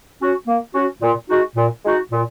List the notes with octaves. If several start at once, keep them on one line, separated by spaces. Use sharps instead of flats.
C#4 F#4
A#3
C#4 F#4
A#2
G#3 D#4 F#4
A#2
G#3 D#4 F#4
A#2